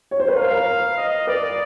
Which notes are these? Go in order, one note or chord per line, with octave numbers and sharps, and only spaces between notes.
C#5
C5
B4
A#4 F5
A#4
D#5
B4 D5